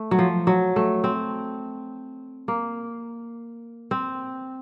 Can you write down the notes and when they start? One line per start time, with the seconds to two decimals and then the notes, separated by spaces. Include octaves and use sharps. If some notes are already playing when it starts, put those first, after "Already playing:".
Already playing: A3
0.11 F#3
0.19 F3
0.47 F#3
0.76 A3
1.04 C4
2.48 A#3
3.91 C4